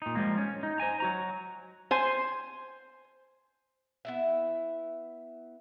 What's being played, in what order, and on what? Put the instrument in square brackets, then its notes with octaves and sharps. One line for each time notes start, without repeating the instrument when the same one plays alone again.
[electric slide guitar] A#2 D#4
F3 G3 G#3 A#3
C#4
D#4
C5 D#5 G#5 A#5
F#3 F#4 A#5
[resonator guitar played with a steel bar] C5 G#5
[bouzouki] B3 E4 E5